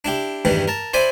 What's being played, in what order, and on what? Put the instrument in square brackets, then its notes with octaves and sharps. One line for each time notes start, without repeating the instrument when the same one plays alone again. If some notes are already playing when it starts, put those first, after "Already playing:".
[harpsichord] D4 E4 G4
E2 G2 D#3 E3 G3
A#4 A5
E4 C5 D5 G#5 B5